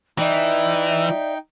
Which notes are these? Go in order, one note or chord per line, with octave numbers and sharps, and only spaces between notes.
E3 D#4 D5 E5 G5